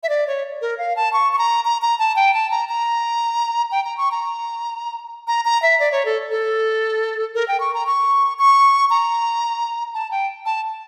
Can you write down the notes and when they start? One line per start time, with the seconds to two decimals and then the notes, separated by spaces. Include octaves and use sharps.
0.03 E5
0.09 D5
0.27 C#5
0.61 A#4
0.78 F5
0.96 A5
1.13 C#6
1.33 C#6
1.38 A#5
1.65 A#5
1.82 A#5
1.99 A5
2.16 G5
2.34 A5
2.51 A#5
2.69 A#5
3.71 G5
3.85 A#5
3.98 C#6
4.12 A#5
5.28 A#5
5.45 A#5
5.62 E5
5.80 D5
5.92 C#5
6.05 A4
6.31 A4
7.35 A#4
7.48 G5
7.60 C#6
7.74 A#5
7.87 C#6
8.39 C#6
8.90 A#5
9.94 A5
10.11 G5
10.46 A5